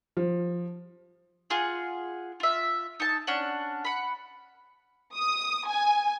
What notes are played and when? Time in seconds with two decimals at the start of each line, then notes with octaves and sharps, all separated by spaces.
0.17 F3
1.50 F4 G#4 F#5
2.40 F4 E5
3.00 D#4 A5
3.27 C#4 D4 F#5
3.85 F#5 B5
5.14 D#6
5.66 G#5